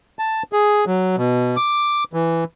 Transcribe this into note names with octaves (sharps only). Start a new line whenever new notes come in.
A5
G#4
F#3
B2
D6
E3